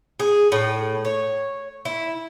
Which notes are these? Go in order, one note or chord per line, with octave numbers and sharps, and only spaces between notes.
G#4
A2
C#5
E4